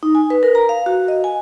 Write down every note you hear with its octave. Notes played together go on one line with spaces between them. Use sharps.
D#4
G#5
B4
A#4
A#5
F5
F#4
D#5
G#5